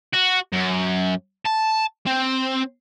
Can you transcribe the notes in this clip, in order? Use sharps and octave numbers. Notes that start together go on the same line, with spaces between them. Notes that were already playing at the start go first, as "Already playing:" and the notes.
F#4
F#2
A5
C4